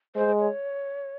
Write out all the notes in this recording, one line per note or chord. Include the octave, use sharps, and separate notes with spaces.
G#3 C5
C#5